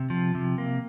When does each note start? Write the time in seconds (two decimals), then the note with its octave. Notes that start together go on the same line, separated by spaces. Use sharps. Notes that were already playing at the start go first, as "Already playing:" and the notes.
Already playing: C3
0.10 F3
0.35 C3
0.58 A#3